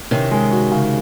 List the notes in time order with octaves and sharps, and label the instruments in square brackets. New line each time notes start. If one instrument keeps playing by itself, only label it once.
[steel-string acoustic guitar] C3 D#3 [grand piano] C#4
[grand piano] G#3
F#4
C#3